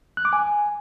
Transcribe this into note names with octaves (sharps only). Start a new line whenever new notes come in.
F#6
D6
G#5